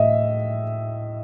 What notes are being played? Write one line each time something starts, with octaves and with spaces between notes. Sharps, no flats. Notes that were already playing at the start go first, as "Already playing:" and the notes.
Already playing: A2 D#5 E5